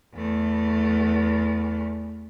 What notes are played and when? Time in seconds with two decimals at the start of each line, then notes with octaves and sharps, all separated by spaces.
0.15 E2 A3